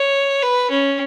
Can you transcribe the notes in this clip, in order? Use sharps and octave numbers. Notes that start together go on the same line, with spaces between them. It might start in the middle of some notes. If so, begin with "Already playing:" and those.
Already playing: C#5
B4
C#4